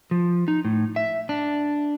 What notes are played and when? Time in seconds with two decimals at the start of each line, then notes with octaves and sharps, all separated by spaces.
0.11 F3
0.48 D#4
0.65 A2
0.96 E5
1.29 D4